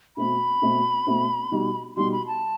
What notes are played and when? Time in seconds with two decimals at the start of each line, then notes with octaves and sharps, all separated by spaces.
0.17 B2 A3 C4 F#4 B5
0.62 B2 A3 C4 F#4
1.07 B2 A3 C4 F#4
1.51 B2 G3 D#4 F#4
1.96 B2 G3 D#4 F#4 C6
2.12 B5
2.27 A5